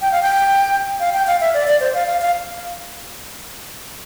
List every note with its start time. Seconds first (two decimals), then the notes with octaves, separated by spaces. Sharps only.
0.01 G5
0.12 F5
0.22 G5
1.00 F5
1.14 G5
1.27 F5
1.41 E5
1.54 D5
1.67 D5
1.80 C5
1.94 F5
2.07 F5
2.21 F5